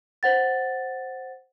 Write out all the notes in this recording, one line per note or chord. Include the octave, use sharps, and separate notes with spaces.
C5 F#5 A6